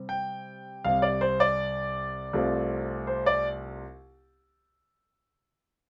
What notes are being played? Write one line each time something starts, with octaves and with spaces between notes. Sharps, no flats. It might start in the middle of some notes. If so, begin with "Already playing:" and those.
Already playing: C3 G3 C4
G5
C2 C3 G3 F5
D5
C5
D5
C2 C3 A3 C4 F4
C5
D5